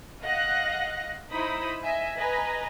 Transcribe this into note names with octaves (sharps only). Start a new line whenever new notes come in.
D#5 F5 F#5 F#6 A#6
D#4 E4 C5 B5 D#6
D#5 E5 G#5
B4 D#5 G#5 A#5